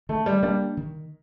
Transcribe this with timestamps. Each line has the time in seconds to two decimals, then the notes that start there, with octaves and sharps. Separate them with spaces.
0.09 D#3 A3
0.26 G3
0.43 G3 A#3 D4
0.77 D#3